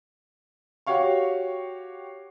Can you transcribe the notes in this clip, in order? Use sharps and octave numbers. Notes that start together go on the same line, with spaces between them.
F#4 G4 C#5 F5 C#6